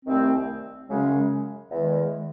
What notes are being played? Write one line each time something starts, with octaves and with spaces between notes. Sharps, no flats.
C2 C3 D#3 A3 C4
F#2 C#3 G#3 C#4
E2 D#3 G#3